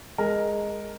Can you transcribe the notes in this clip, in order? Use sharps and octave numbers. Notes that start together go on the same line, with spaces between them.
G#3 A#4